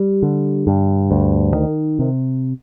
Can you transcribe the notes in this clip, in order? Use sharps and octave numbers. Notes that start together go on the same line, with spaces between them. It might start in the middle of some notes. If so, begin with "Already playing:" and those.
Already playing: G3
D3
G2
D2
D#3
C3